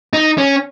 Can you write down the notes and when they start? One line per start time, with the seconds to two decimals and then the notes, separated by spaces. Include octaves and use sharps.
0.13 D#4
0.38 C#4